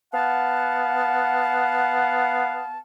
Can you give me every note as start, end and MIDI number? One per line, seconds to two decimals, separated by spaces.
0.13 2.79 59
0.13 2.79 77
0.13 2.79 78
0.13 2.79 81